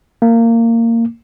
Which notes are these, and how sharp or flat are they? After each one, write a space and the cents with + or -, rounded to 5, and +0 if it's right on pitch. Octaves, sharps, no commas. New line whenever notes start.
A#3 -20